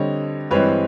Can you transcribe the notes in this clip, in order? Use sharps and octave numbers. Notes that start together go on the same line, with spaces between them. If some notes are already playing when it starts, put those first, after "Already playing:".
Already playing: D3 G3 C4 C#5 D#5
G2 E3 G#3 C4 B4 C#5